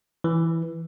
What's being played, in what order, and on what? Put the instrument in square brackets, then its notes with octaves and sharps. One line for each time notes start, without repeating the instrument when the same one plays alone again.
[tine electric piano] E3